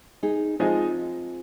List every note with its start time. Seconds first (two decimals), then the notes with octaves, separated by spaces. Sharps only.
0.23 D#4 G#4
0.59 F3 G#3 C4 D#4 F4 G#4 D#5